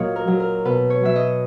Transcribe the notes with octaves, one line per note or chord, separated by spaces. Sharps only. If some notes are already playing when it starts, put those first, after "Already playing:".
Already playing: A#2 F#3 C#5 D#5
A#4
F#3
A#4
B2 B4
C#5
F#3 E5
D#5